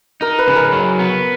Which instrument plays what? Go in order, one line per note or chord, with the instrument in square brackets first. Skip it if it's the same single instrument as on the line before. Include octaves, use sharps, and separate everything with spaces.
[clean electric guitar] D#4 [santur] A#4
[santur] B4
[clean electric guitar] C#3
[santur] A#4
[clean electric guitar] F#3
B3